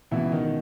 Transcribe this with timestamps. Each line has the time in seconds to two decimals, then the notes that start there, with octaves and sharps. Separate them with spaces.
0.11 C#2 B2 E3 E4
0.31 D#3 D#4